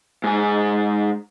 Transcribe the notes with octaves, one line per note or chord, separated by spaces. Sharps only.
G#2 G#4